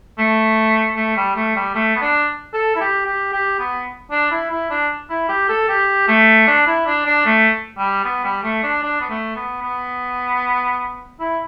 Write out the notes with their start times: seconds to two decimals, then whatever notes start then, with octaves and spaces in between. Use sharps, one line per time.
0.19 A3
0.96 A3
1.17 G3
1.36 A3
1.56 G3
1.75 A3
1.96 B3
2.02 D4
2.54 A4
2.76 E4
2.81 G4
3.06 G4
3.33 G4
3.59 B3
4.11 D4
4.31 E4
4.51 E4
4.70 D4
5.10 E4
5.29 G4
5.49 A4
5.69 G4
6.08 A3
6.48 D4
6.67 E4
6.87 D4
7.06 D4
7.26 A3
7.78 G3
8.05 B3
8.25 G3
8.44 A3
8.63 D4
8.83 D4
9.01 B3
9.10 A3
9.36 B3
9.62 B3
11.20 E4